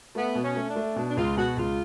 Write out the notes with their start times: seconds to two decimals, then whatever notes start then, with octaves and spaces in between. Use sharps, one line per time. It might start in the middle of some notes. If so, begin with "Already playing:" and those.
0.15 A3 B3
0.35 B2
0.42 C#4
0.56 A3
0.69 D4
0.76 A3
0.96 B2 D4
1.09 D4
1.17 C#2 F4
1.36 B2 F#4
1.57 C#2 F4